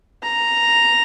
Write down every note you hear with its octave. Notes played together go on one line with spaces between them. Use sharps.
A#5